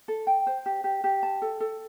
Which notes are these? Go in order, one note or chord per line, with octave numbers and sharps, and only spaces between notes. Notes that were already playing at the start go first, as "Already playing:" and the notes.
A4
G5
C5
G4
G4
G4
A5
A4
A4